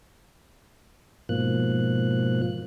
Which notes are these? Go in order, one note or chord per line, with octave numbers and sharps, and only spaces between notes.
G#2 B2 F3 A#3 F#6